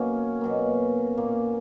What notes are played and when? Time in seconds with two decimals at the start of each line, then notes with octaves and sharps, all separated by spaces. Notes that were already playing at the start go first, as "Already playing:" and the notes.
Already playing: B2 F#3 A#3 C#4
0.41 B2 F#3 A#3
1.17 A#2 A#3